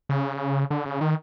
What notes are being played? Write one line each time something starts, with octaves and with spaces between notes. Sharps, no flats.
C#3
D3
C#3
D#3